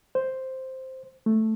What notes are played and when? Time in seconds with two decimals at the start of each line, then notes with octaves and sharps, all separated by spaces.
0.15 C5
1.26 A3